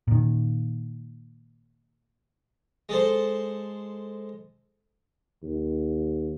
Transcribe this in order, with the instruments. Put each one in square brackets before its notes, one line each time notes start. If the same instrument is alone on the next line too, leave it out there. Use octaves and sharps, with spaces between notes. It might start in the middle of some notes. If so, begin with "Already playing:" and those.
[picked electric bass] A#2 D#3
[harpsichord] G#3 A4 C5
[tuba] D#2